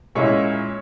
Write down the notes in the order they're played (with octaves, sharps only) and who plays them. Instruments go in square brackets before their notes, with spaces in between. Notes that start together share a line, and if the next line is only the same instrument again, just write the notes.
[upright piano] A#2 G#3 C#4 E4 C#5